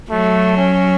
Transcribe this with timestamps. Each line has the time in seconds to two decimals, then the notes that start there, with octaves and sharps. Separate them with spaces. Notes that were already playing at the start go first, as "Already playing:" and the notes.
0.10 F#3 A3
0.57 C#4